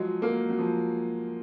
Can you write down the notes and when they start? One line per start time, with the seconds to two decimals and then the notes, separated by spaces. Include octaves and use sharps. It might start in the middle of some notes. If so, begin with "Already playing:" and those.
Already playing: F3 F#3 G#3
0.22 F#3 A#3
0.50 F#3
0.59 F3